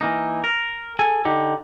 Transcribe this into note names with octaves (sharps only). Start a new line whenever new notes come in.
E3 A#3 D#4
A#4
G#4 A4 G#5
D3 D#4 G4